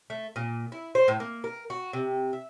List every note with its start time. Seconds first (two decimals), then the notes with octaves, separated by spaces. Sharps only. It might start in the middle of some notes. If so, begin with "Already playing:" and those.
0.10 A3
0.36 A#2
0.72 E4
0.95 C5
1.08 A2
1.20 A#3
1.44 A#4
1.70 F#4
1.93 C3
2.33 E5